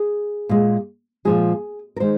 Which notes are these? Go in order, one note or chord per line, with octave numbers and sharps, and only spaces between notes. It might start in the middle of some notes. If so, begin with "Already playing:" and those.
Already playing: G#4
A#2 G#3
A#2 F3 G#3 G#4
A#4
D#3 G#3 C5